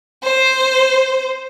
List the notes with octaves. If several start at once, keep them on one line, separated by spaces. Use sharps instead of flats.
C5